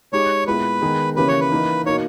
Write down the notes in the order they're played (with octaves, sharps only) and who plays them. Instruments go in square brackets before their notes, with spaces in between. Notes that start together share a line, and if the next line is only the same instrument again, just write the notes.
[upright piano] G#3 D#4 G4 [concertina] C#5
[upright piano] A#2 G#3 B3 E4 [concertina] B4
[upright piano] D#3 G#3 B3 D#4 G#4
[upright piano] C#3 E3 A#3 C#4 G4 [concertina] B4
[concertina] C#5
B4
[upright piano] E3 A#3 D#4
[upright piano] B2 A#3 D#4 [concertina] C#5